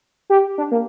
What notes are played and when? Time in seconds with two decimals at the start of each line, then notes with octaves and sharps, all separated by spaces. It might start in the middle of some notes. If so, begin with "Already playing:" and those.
0.30 G4
0.58 D4
0.71 A#3